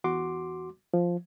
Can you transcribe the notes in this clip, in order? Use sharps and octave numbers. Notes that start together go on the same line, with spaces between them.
E2 F#4 C6 D6
F3